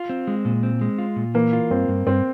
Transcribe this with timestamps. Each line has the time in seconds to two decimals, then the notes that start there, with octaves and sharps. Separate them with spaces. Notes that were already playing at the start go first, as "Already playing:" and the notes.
Already playing: F4
0.09 C4
0.27 G#3
0.45 A#2
0.63 C4
0.81 G#3
0.98 F4
1.16 A#2
1.34 E3 A#3
1.53 F4
1.70 G2 C4
1.88 G2
2.07 G2 C4